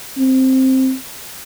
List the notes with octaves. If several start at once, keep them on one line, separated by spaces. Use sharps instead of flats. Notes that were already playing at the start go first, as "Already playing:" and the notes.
C4